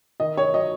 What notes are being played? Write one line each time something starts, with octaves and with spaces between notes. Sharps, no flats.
D#3 D#5
C#5
F#3 D#5